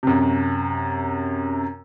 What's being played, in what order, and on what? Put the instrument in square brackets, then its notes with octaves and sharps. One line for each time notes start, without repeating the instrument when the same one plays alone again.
[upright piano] F#2 C3